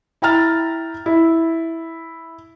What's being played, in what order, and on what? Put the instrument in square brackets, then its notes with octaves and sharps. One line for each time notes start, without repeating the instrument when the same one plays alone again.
[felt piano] E4 G5 A#5 F6 A6
E4